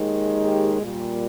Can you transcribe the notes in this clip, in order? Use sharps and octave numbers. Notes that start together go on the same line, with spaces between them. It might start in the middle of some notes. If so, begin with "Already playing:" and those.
Already playing: D#2 D#3 G#3
G4
A#2 G3